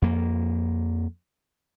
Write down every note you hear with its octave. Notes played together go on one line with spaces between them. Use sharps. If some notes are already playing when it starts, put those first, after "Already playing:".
F2 A#3